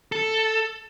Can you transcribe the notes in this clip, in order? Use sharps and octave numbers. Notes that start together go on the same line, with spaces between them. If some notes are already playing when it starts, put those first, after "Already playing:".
A4